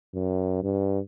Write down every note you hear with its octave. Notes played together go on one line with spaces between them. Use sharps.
F#2
G2